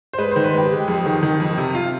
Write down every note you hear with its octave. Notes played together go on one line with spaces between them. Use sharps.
C5
G#3 B4
C5
D#3
B4
G#3 G4
G#3
F2
D#3
D#3
F2
C3
F4